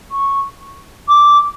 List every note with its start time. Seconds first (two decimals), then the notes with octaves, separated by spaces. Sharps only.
0.11 C#6
1.08 D6